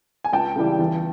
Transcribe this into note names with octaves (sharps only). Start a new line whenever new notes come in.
G#5
C#2 G5 A5
C#3 E3 G3
E2